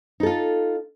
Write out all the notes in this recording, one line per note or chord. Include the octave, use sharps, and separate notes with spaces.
D#4 F4 A4